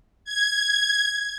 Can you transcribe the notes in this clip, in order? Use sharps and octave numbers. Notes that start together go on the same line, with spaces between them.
G#6